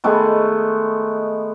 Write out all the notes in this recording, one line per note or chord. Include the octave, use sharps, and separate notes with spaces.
D#3 G#3 A3 B3